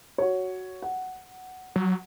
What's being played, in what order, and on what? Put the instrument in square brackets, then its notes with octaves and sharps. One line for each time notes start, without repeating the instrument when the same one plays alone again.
[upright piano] F#4 C#5
F#5
[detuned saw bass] F#3